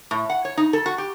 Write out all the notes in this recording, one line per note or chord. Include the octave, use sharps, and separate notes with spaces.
A2
F#5
C#5
D#4
A4
F#4
G4